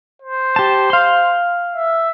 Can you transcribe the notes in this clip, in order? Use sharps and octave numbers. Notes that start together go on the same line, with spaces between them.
C5
G4 A5
F5 C6
E5